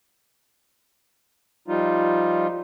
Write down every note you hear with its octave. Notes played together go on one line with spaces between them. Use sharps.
F3 G3 D#4 F4